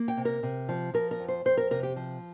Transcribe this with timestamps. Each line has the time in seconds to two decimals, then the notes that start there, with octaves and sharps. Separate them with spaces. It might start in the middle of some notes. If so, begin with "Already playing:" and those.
Already playing: A#3
0.08 G5
0.17 C3
0.25 A#4
0.43 C3
0.69 F3
0.94 F3 A#4
1.11 A#4
1.20 F2
1.28 C5
1.45 F2 C5
1.57 A#4
1.71 C3 A#4
1.83 G4
1.96 F3